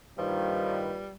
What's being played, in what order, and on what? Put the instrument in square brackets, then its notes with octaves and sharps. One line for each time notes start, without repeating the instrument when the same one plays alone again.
[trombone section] G2 D#3 [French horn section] A#2 F4 B4 [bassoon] F3 [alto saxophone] G3